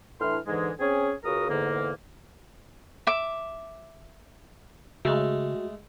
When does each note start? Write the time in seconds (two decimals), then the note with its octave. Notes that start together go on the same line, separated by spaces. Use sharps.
0.21 A2 E3 D4 C6 F6
0.47 G#2 D3 E3 G#3
0.80 C4 C#4 G#4
1.24 C#2 C#3 F#4 A#4 D#6
1.50 E2 G#2 D3 A#3
3.07 E5 D6
5.05 C#3 G#3 A3 F#4